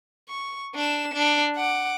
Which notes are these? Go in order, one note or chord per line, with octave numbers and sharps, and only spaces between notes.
C#6
D4 E7
D4
F#5 D6